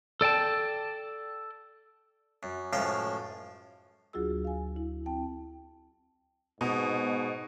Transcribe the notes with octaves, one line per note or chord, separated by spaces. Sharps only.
A4 D5 G5 A5
F#2
C#2 F#2 A2 F3 F5 G5
D2 F#3 F4 F#4 G#4 E6
F5 G#5
E4
C4 G5 A5
G#2 B2